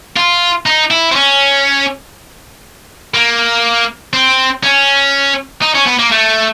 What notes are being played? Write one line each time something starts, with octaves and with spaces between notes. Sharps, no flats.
F4
D#4
E4
C4
C#4
A#3
C4
C#4
D#4
C#4
B3
A#3
A3